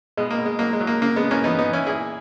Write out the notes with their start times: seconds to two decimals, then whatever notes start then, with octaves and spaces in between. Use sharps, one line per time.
0.17 B2 G#3
0.30 A#3
0.38 B2
0.46 G#3
0.59 F#3 A#3
0.73 G#3
0.81 F#3
0.87 A#3
1.01 C#3 A#3
1.16 G#3 B3
1.23 C#3
1.31 A#3 C#4
1.44 E3 B3 D#4
1.59 B3 D#4
1.66 E3
1.73 C#4 E4
1.86 A#2 E4 G#4